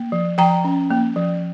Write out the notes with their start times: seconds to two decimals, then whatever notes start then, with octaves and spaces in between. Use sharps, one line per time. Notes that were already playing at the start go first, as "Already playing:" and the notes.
Already playing: A#3
0.12 F3
0.38 F3 G5 A#5
0.64 C#4
0.90 A#3
1.16 F3